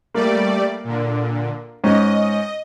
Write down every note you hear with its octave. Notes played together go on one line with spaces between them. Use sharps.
G3 A3 A#3 D5
A#2 D3
G#2 C#4 D#5